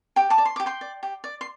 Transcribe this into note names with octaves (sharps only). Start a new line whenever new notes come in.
G4 G5
A5 D6
D5
C6
G4 D6
G5 C6
D5
G4
D5
C6